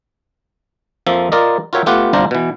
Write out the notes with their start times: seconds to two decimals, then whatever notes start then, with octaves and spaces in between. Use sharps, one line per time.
1.06 F2 F3 A#3 E5
1.32 F4 A#4 D5 D#5
1.73 F4 F#4 A#4 C#5 E5 G5
1.86 A3 B3 F4 G4 F#5
2.13 G1 C2 D4 F4 C5 A#5
2.31 B2 E3